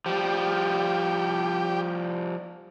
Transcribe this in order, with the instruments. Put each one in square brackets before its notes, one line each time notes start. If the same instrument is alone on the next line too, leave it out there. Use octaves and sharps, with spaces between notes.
[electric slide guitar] F3 G3 [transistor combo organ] G4